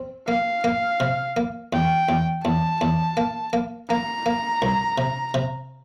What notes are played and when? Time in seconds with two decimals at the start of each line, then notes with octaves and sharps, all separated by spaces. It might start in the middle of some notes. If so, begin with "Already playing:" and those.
Already playing: C4
0.28 A#3 F5
0.64 A#3
1.00 C3
1.37 A#3
1.73 E2 G5
2.09 E2
2.45 E2 A5
2.81 E2
3.17 A#3
3.53 A#3
3.90 A#3 A#5
4.26 A#3
4.62 C2
4.98 C3
5.34 C3